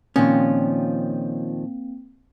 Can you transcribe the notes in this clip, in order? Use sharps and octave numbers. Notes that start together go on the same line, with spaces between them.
A#2 D#3 F3 A#3 C4 C#4